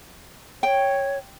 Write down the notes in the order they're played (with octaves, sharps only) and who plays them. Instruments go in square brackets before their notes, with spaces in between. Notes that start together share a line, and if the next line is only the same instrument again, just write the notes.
[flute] C#5 [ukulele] G5